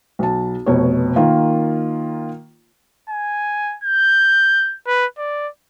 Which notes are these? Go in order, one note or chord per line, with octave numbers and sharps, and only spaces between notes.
B1 A5
F1 B2 C#5
D#3 A#3 F4
G#5
G6
B4
D5